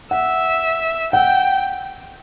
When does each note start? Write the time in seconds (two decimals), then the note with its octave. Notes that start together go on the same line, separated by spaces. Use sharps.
0.11 E5 F#5
1.13 F#5 G5